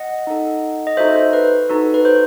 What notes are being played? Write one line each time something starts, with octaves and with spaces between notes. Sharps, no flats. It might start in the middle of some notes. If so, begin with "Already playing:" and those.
Already playing: D#5 F#5
D#4 A4
D#5
D#4 F#4 A4 C5 E5
C5
B4
D#4 F#4 A4
B4
C5